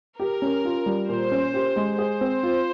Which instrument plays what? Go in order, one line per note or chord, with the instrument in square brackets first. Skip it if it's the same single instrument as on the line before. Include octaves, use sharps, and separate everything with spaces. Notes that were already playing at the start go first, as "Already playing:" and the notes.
[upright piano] G4 [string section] A#4
[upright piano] C#4
F4
G3
[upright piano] A#2 [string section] C5
[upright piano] C#4
G4
G#3
[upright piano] G#4 [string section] C5
[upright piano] C4
F4